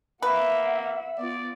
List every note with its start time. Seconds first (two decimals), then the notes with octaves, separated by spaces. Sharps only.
0.22 A#3 B4 E5 F#5
1.17 B3 F4 D5